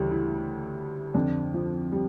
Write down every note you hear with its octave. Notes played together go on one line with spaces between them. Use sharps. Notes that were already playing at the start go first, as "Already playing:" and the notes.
Already playing: D2 C#3 E3 G3
E4
F2 D3 D4
F3
G3